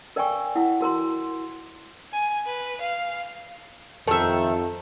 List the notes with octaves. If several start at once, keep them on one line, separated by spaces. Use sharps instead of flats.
A#4 D5 F5 G5 G#5 C#6
E4 F#5
F#4 A#4 A#5 C6
G#5
B4
F5
F2 D#3 A4 E5